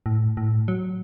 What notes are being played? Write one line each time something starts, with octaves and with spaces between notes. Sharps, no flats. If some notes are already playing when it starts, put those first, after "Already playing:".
A2
A2
F#3